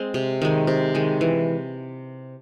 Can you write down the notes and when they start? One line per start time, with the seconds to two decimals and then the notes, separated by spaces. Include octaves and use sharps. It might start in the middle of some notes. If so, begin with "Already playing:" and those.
Already playing: G#3 C4
0.14 C3
0.42 D#3 G#3
0.67 C3
0.95 D#3 G#3
1.21 E3